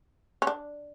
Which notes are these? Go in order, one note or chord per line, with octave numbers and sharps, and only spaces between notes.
C#4
D4